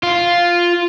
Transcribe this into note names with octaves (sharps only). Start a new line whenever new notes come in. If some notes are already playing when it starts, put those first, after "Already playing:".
F4